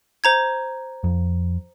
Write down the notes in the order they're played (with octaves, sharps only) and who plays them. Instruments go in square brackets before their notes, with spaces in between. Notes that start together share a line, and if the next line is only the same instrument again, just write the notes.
[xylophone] C5 A#5 G#6
[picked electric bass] F2